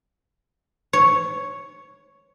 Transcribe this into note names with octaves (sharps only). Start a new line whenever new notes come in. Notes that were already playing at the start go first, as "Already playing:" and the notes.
C#5